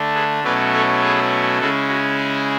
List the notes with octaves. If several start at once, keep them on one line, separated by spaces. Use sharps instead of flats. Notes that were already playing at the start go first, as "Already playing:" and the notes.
Already playing: D3 A3 D4
G#4 B4
B2 F#3 A3 C#4 E4 B4 D5
A4 C#5
G#4 B4
C#3 G#3 C#4 E4 F#4 A4
F#4
G#4